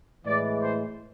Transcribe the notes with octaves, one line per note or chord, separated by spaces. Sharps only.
A2 E3 G#3 D5
C5